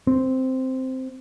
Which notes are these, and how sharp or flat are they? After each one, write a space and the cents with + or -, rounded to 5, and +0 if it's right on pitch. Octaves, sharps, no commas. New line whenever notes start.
C4 -5